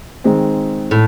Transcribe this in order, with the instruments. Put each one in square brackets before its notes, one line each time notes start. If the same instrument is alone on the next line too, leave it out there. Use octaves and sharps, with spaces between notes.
[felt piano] D#3 G#3 C4
[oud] A2